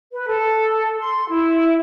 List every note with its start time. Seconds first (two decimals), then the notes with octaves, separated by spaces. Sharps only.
0.13 B4
0.27 A4
0.99 C6
1.29 E4